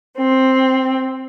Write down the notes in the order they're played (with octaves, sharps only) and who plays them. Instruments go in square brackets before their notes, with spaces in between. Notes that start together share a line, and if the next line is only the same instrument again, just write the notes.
[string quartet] C4